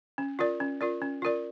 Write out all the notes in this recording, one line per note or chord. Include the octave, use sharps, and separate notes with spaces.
C#4
F4 A#4 D5
C#4
F4 A#4 D5
C#4
F4 A#4 D5